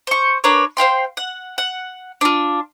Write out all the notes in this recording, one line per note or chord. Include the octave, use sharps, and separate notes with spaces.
C5 C#6
D4 A#4 B4 C#5
C5 F5 G5 C6
F#5
F#5
D4 F4